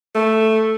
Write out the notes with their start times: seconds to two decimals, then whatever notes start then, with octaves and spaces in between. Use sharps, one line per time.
0.15 A3